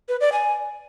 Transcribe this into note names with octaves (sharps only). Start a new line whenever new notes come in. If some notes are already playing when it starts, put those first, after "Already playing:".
B4
D5
G#5